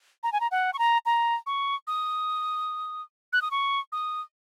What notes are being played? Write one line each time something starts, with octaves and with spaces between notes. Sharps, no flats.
A#5
G#5
A#5
F#5
C#6
A#5
A#5
C#6
D#6
F#6
D#6
C#6
D#6